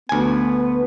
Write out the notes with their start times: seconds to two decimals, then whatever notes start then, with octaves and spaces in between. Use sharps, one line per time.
0.09 D2 B3 G#5